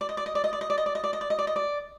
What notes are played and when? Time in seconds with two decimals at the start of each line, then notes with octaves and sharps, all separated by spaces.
0.01 D5
0.09 D#5
0.17 D5
0.26 D#5
0.35 D5
0.44 D#5
0.53 D5
0.61 D#5
0.70 D5
0.78 D#5
0.86 D5
0.95 D#5
1.04 D5
1.13 D#5
1.21 D5
1.30 D#5
1.39 D5
1.47 D#5
1.56 D5